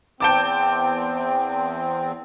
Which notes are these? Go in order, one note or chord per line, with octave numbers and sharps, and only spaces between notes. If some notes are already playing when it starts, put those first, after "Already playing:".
E2 C4 G5 A5 D6